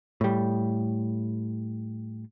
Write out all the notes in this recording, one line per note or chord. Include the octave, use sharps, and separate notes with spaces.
A2 G3